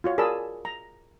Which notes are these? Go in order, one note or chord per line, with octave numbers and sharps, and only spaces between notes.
F4 F#4 C#5
G#4 A#4 D5 A5 B5 E6
A#5